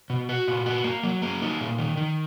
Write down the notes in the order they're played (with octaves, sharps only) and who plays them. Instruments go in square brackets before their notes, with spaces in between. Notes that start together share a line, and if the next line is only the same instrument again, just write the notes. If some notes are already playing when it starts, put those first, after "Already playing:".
[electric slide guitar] B2
F#4
A#2
F#4
A#3
F#3
A#3
D#4
A#2
D#3
D#3